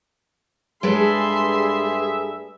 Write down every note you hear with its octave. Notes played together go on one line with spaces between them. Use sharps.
G2 G#3 G#4 A4 B4 E5 C6